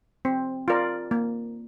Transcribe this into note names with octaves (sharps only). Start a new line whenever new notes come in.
C4
F4 A#4 D5
A#3